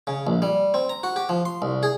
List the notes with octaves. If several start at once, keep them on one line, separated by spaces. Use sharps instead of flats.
C#3
A#1
G3
C4
A#5
F#4
G4
F3
C6
C2
G#4